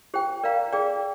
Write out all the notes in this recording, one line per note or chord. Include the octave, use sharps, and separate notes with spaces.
G4 C5 G5
A#4 D5 F5 A#5
G#4 D5 G5